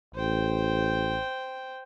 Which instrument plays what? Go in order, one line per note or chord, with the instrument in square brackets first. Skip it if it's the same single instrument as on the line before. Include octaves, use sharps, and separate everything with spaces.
[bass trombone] A1 [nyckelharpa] C5 G5